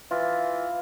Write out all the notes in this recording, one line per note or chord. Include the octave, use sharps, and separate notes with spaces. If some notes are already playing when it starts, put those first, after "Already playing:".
E3 F4